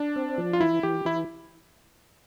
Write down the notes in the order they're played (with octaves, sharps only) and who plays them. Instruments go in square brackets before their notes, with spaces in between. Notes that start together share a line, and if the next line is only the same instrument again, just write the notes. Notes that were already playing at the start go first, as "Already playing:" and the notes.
Already playing: [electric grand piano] D4
[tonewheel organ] C4
F3
[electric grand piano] F4
[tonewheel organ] E3 [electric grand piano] E4
[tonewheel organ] E3 [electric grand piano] G4
[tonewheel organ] E3 [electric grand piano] E4